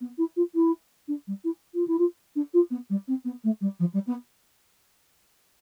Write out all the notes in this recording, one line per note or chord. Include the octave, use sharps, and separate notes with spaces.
B3
E4
F4
E4
D4
G3
E4
F4
E4
F4
D4
F4
B3
G3
C4
B3
A3
G3
F3
G3
B3